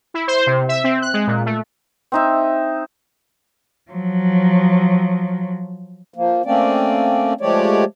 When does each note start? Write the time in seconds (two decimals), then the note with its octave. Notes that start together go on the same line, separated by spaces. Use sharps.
0.14 E4
0.28 C5
0.47 C3
0.69 E5
0.84 C4
1.02 F#6
1.14 G#3
1.27 A#2
1.46 A3
2.12 C4 D#4 E5
3.91 F3 F#3
6.14 F3 A#3
6.45 A3 A#3 C4 C#4 D5
7.41 F3 G#3 A3 G4 C#5 D5